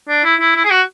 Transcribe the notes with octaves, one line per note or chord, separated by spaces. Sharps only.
D4
E4
E4
E4
G#4
F#4